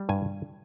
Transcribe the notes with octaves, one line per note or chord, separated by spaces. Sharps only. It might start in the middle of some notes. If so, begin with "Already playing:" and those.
Already playing: G3
G2 G#5